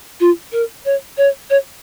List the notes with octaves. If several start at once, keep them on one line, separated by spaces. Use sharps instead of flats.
F4
A#4
C#5
C#5
C#5